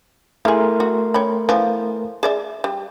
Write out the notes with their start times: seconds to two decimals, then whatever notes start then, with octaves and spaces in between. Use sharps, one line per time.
0.45 A3 E4 G#4 A#4 C6
0.80 F#4
1.14 C#5 G5 B5
1.49 E3 F3 B3
2.23 G#4 D5 E5
2.64 G3